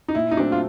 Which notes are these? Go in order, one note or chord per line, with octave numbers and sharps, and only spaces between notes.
D#4
A#2 E4
D#4
F#3 A3 C4 D4
F4